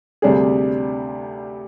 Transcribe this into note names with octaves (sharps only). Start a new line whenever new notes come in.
D2 C3 G3 D4 G#4